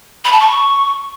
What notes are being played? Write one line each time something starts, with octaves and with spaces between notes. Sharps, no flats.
B5
A5
C#6